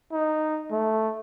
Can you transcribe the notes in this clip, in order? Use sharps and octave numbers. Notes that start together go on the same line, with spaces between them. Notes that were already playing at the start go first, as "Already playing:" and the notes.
D#4
A3